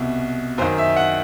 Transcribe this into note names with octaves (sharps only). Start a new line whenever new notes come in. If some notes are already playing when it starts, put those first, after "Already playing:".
Already playing: C2 B2
F#2 D#3 C5
E5
F#5